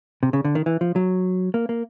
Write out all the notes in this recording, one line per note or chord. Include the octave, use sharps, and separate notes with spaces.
C3
C#3
D3
D#3
E3
F3
F#3
A#3
A#3